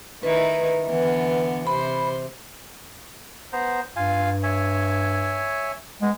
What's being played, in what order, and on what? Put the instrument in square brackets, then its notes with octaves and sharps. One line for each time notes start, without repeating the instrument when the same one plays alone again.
[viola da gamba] D#3 D#4 E4 [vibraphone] B4
[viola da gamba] D3 E3 B3
[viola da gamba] C3 C5 [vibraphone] B5
[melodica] B3 C5 A#5
[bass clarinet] G2 [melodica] F4 F5 G#5
[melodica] C#5 E5 G#5
[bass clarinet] G#3 [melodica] B3